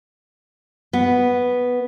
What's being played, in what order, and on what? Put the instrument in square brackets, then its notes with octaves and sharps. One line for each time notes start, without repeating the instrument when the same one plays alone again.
[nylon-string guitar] B3